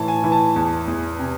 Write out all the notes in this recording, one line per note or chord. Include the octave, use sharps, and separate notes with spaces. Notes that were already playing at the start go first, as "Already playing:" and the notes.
Already playing: A2 E3 A5
G#5
E3
A5
E2
E2
C3